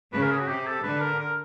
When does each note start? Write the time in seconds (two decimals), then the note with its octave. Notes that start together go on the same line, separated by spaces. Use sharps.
0.13 C#3 B4
0.22 A#4
0.31 G#4
0.39 F#4
0.48 C3 G4
0.66 A4
0.83 D3 B4
1.00 A#4
1.19 A#4